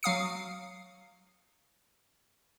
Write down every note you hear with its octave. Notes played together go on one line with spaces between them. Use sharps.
F#3 F5 D#6 C#7